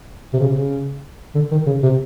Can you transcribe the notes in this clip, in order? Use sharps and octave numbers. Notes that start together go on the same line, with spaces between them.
C3
C#3
C3
C#3
D3
D#3
C#3
C3